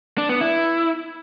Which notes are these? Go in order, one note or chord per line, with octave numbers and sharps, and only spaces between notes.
D4
B3
E4